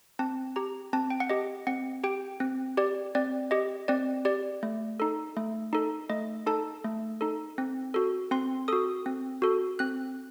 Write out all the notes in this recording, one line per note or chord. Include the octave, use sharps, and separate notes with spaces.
C4 A5
G4 A#5
C4 A5
G5
F#5
G4 D#5
C4 F#5
G4 G5
C4
G4 D5
C4 D5
G4 D#5
C4 D5
G4 D5
A3
D#4 A4
A3
D#4 A4
A3 D#5
D#4 A4 A5
A3
D#4 A4
C4
F#4 A4
C4 C6
F#4 A4 D#6
C4
F#4 A4
C4 F#6